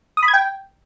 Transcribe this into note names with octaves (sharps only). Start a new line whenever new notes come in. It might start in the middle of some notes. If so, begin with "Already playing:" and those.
D#6
B5
G#6
G5